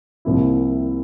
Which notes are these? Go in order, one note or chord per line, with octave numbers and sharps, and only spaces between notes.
C2 C3 F3 A#3 E4